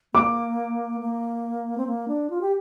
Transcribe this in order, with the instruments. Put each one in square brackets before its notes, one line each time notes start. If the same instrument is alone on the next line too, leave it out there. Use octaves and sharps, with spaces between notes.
[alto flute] A#3 [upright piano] D6
[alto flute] A#3
C4
A#3
D4
F4
G4